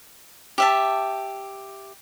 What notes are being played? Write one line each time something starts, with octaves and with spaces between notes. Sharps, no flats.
G4 E5 A5